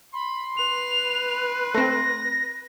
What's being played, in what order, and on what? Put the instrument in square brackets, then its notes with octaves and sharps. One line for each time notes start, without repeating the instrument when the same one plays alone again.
[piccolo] B5 [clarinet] C6
[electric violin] B4 [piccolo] F7
[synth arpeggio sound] A3 C4 [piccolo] A#6